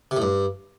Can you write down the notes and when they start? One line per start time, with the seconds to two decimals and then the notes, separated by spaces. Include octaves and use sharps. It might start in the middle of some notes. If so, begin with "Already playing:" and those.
0.11 C3
0.17 A2
0.22 G2